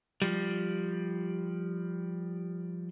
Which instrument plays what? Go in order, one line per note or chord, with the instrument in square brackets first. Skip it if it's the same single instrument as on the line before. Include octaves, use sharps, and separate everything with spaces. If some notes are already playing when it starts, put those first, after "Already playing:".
[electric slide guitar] F3 G3